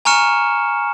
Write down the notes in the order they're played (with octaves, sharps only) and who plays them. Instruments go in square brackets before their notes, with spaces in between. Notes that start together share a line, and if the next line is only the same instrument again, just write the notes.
[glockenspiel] G#5 A#5 C#6 F6 C#7 E7